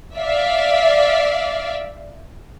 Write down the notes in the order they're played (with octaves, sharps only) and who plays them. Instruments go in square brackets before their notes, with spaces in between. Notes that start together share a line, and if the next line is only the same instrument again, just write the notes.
[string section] D5 E5 F5